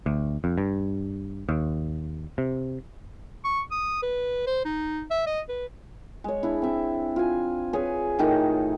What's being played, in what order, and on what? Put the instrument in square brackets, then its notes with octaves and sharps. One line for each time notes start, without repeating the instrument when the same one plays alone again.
[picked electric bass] D2
F2
G2
D#2
C3
[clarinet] C#6
D#6
B4
C5
D#4
E5
D#5
B4
[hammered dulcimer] G#3 C#5
D4 E4
C4 E5
F4 G#5
G#4 B4 C#5
A2 D#3 D#4 A4